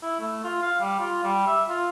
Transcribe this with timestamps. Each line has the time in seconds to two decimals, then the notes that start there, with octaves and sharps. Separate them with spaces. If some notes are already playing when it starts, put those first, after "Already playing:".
0.03 E4
0.20 A3
0.44 F4
0.63 F5
0.80 G3
1.00 F4
1.24 G3
1.47 E5
1.69 F4